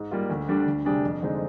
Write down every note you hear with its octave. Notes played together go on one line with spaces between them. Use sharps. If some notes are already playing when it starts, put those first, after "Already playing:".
Already playing: G#2
G3 A#3 F4
D2
D3 G3 D4
D2
C3 G3 D4 G#4
F2
D3 G#3 C4 D#4